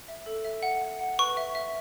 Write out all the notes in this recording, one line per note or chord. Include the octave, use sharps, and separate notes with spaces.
E5
A4
E5
F#5
F#5
F#5
B4 C#6
E5
E5